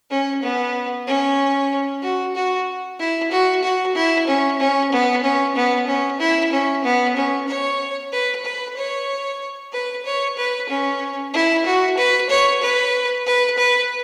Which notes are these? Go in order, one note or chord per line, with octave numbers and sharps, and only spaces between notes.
C#4
B3
C#4
F#4
F#4
E4
F#4
F#4
E4
C#4
C#4
B3
C#4
B3
C#4
E4
C#4
B3
C#4
C#5
B4
B4
C#5
B4
C#5
B4
C#4
E4
F#4
B4
C#5
B4
B4
B4